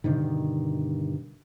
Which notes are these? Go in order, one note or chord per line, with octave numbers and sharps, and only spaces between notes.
G2 B2 D3 D#3